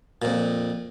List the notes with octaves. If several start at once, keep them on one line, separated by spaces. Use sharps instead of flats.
F2 A#2